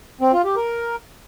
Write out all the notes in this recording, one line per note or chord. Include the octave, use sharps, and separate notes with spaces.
C4
F4
G4
A#4